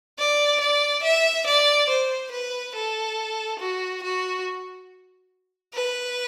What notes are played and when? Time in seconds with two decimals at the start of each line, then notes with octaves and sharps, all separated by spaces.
0.19 D5
0.61 D5
1.03 E5
1.47 D5
1.89 C5
2.31 B4
2.75 A4
3.59 F#4
4.03 F#4
5.74 B4